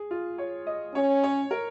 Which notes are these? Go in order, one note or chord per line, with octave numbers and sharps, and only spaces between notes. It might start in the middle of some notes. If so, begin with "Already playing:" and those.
Already playing: G#4
F4
C#5
D#5
C#4 C#5
C#5
A#4